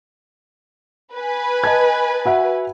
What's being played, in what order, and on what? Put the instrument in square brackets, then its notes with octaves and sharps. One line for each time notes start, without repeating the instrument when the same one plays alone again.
[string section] B4 G#5
[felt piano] D#5 A5 G#6
F#4 E5 F#5